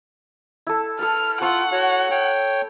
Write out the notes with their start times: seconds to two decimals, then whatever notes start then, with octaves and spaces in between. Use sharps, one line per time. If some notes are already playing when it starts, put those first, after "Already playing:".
0.67 E4 A4
0.99 A4 B4 A5 F6
1.41 F4 F#5 A5 C#6 E6
1.72 F#4 C#5
2.11 C#5 G5